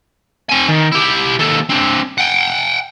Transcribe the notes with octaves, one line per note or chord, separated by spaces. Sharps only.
C4 G#5
D#3
E4 G4
D#2 A4
C4 D4
F#5 G5